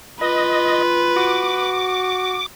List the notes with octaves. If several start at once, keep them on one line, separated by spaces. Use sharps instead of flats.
F4 B4 D#5
F#4 D6